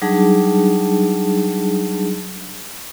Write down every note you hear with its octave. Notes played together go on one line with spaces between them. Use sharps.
F#3 G3 D4 D#4 G#4 A5